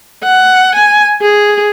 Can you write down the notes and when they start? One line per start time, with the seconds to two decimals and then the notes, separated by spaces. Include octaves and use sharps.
0.23 F#5
0.75 G#5
1.21 G#4